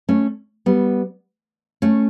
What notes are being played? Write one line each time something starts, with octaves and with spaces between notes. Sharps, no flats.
A3 C#4
G3 B3
A3 C#4